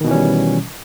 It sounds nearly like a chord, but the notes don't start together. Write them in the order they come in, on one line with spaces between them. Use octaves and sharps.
D#3 B2 E3 C#4 G3